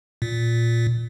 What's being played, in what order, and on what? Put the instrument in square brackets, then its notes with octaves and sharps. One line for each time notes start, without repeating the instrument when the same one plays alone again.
[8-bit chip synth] A#2